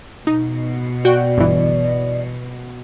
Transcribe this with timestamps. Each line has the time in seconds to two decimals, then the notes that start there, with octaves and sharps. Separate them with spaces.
0.27 B2 D#4
1.05 F#4 D5 G5
1.38 G1 E3